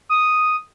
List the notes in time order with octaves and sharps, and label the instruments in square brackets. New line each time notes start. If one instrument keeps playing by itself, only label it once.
[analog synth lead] D#6